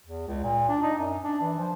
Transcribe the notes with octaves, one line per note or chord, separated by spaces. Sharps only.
E2
C#2
A#2
D4
D#4
F#2
D4
E3
F3